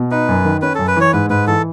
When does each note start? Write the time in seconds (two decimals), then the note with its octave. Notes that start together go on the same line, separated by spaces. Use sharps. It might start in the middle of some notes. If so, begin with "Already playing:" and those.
Already playing: B2
0.11 D#4 B4
0.29 F#2
0.45 D#3
0.62 C#4 B4
0.75 F#2 A4
0.87 B4
0.97 E3 C#5
1.13 G#2 B4
1.30 G#2 B4
1.47 E3 A4